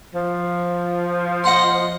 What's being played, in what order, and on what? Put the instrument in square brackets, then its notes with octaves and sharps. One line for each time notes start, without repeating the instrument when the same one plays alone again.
[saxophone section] F3
[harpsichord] D#5 F#5 C6